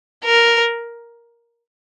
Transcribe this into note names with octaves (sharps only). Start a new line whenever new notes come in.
A#4